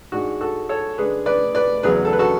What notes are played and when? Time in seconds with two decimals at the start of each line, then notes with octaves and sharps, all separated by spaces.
0.12 G#2 G#3 D4 F#4
0.41 F#4 A4
0.69 A4 C#5
0.97 C#3 G#3 D4 G#4 B4
1.26 B4 D5
1.55 B4 D5
1.83 E2 C#3 F#3 G#4 B4
2.05 A4
2.13 B4
2.19 F#4 A4